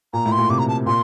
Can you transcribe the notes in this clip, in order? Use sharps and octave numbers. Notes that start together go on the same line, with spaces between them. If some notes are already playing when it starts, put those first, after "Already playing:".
A#2 A#5
A2
C6
A#2
C3 D6
A#5
A5
A#2 C6